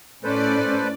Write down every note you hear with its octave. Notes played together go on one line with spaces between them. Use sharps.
A2 C#4 A4 B4 C5 D5